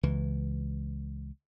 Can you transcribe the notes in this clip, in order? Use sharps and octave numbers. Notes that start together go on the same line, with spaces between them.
C#2 E3